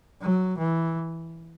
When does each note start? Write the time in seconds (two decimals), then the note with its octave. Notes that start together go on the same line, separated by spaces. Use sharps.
0.21 F#3
0.58 E3